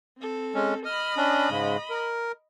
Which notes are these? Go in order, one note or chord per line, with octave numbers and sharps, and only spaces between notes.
C4 A4
G#3 C#4
D#5 B5 F6
C#4 D4
G#2 C#3 G#3
A#4